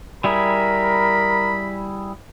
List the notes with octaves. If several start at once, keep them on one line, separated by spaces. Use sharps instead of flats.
G3 E4 G#4 A#4 B5